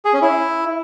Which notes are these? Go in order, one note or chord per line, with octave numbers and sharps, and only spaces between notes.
G#4
C#4
E4